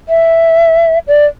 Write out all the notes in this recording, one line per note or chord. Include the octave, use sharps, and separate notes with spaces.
E5
D5